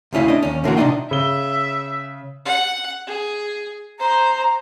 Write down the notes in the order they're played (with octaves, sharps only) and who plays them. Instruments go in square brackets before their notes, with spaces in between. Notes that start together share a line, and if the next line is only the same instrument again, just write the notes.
[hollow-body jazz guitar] D2 C#3 C#4 E4 F5
D4 D#5
D#2 C#4
D3 E3 A#3 C#4 F4 F#4
C3 D4 D#4 F4 D#5 G5
[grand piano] C#3 G7 [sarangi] E5
[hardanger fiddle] F#5
G#4
[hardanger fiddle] C5 [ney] A#5